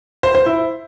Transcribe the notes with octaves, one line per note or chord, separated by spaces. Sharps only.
C5
C5
E4